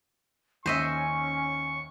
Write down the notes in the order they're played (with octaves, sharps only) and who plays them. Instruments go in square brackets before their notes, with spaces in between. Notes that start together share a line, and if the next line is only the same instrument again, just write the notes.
[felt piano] D#2 [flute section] C#4 [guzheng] C5 D#5 E5 [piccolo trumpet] C#6